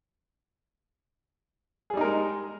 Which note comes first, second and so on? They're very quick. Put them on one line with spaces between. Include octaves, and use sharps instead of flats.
G#4 G3 D#4 A#4 G#3